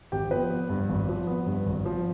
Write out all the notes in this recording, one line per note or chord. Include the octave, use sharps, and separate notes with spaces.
G#1 G4 G5
F3 B3 B4
B3
G2
G#1
F3
B3
G2
G#1
F3